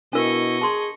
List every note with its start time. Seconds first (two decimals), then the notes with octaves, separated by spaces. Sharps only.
0.13 B2 D4 E4 A#4 D#5 C#6
0.61 G#4 A5 C6